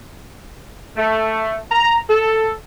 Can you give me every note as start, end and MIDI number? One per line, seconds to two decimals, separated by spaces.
0.97 1.58 57
1.72 1.97 82
2.10 2.51 69